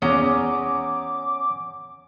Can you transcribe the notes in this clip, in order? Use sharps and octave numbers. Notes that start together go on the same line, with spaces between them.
E2 C#4 C#5 F#5 A#5 D6 D#6